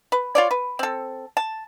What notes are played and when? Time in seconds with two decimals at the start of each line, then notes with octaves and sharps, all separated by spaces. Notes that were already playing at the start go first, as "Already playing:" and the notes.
0.12 B4
0.35 F4 C#5 D5
0.51 B4
0.79 C4 A4
1.37 A5